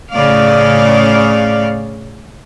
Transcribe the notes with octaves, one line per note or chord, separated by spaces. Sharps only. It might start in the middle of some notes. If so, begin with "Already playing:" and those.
A2 C#3 D5 F5